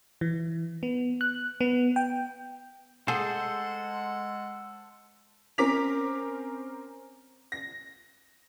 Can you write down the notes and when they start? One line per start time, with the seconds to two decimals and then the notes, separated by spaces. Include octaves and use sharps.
0.21 E3
0.83 B3
1.21 F#6
1.61 B3
1.96 G5
3.08 G#3 G#4 A4 C5 F#5
5.58 C4 C#4 A#4 D6 B6 F7
7.52 A#6